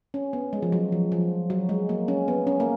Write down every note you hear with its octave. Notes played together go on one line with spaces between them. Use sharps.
C#4
B3
G#3
F3
F#3
F3
F3
F#3
G#3
A#3
C#4
B3
C#4
A#3